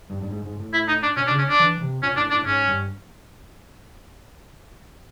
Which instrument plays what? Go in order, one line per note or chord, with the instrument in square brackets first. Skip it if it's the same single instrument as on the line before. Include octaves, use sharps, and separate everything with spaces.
[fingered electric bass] G2
G2
G#2
G#2
A2
[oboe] E4
D#4
D4
[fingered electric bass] B2 [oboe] C#4
[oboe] D4
[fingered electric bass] C#3
[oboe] C#4
D4
[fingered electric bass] E3
C3
[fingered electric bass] A#2 [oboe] C#4
[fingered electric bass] A2 [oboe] D4
[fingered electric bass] A2 [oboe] D4
[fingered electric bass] G#2 [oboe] C#4
[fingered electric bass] G2